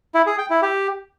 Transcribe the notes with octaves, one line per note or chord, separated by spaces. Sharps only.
E4
G#4
G5
E4
G4